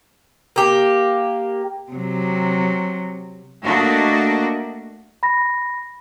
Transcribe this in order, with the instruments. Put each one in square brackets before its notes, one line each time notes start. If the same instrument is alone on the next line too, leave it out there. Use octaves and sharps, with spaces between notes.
[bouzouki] A#3 G4
[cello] C3 F#3
[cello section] A3 A#3 D4 F#4 A#4 D#5
[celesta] B5 A#6